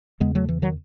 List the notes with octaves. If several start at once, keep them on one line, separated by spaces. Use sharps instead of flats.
E2 C#3 G#3 B3
F#3 A3
E3
D#3 F#3